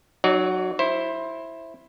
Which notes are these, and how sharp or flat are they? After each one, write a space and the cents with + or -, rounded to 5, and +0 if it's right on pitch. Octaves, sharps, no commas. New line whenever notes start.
F#3 +0 D#4 -30 D5 -45
E4 +0 C5 +15